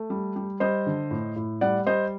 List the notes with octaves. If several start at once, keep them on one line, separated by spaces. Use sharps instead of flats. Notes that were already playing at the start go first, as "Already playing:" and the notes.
Already playing: A3
G3
G3
G3 C5 D#5
D3
A2
A2
G3 D5 F#5
G3 C5 D#5